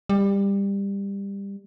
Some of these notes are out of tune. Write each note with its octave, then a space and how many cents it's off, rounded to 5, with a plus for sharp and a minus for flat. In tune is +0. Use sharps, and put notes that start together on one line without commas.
G3 +20